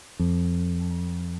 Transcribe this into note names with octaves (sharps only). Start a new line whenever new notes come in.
F2